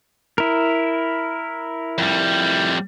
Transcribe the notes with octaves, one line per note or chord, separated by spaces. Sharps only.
E4 A#4
F2 G3